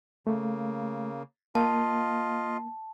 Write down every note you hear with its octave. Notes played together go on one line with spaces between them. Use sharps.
C#3 A3 A#3
A#3 F4 D#5 F5 A5